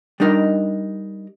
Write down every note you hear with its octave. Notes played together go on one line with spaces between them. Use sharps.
G3 D4 D#4 A#4 D#5